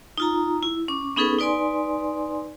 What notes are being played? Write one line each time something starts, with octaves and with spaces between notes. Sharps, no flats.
D#4 F4 A#5
E4
C#4 D6
B3 C#4 D#4 G#4 A4 B4
D#4 B4 D5 G#5 C6